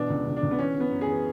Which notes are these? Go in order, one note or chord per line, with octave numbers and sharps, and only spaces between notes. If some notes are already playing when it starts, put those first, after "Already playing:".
Already playing: B2 E3 D4
C#2
C#2
D4
C#2
B3
E3 C#4
E3
B3
F#2
G#4
E3